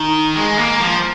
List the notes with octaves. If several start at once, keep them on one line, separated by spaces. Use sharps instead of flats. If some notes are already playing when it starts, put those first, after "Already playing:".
Already playing: D#3
G#3
A#3
F3